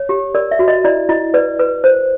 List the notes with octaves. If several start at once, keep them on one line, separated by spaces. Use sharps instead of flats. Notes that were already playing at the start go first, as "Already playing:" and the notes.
Already playing: C#5
G4
A#4 D5
E5
F#4
D#5
E4 D5
E4 D#5
B4 D5
B4
C5